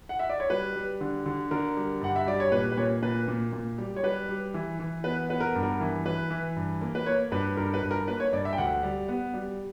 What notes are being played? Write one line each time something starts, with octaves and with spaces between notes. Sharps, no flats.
F#5
E5
D5
C#5
G3 B4
G3
D3
D3
D3 A#4
G3
G2 F#5
E5
G3 D5
C#5
A#2 B4
B4
A#2 C#5
A#2 B4
A#2
A#2
G3
C#5
G3 B4
G3
E3
E3
B3 B4
B3 B4
A#4
G2
A#4
E3
E3 B4
E3
G2
A#3
B4
A#3 C#5
G2 B4
G2 A#4
B4
G2
A#4
A#3 B4
C#5
G2 D5
E5
G5
D2 F#5
G3
B3
G3